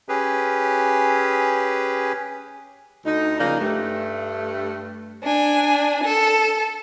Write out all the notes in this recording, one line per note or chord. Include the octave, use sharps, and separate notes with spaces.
C#4 G4 G#4 B4
D2 D#4
C#3 F3 A#3 D4 D#4
G2 A3
D4 G#5
A4